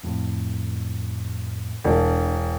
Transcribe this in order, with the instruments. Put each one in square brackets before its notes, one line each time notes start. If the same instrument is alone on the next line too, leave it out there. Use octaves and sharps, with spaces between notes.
[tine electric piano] F2 A2
[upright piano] E1 [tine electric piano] D4